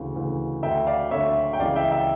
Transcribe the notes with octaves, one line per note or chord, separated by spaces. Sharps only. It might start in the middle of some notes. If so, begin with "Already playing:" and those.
Already playing: D2 C#3 E3
D2 C#3 E3
D2 D3 E5 G5
D5 F5
D2 D3 C#5 E5
G5
C#2 C#3 E3 D5 F5
E5 G5
E5 G5